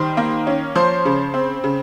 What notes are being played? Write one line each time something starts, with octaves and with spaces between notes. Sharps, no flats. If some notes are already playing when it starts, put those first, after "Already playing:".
Already playing: D#3 G3 C5 C6
A#3
C#4
F3 C5 C6
C#3
C4
C#3